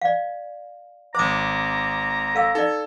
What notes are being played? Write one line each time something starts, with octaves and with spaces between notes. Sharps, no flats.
D5 F5
G#1 C5 A#5 D6 D#6
A4 F5 E6
D#4 A4 D5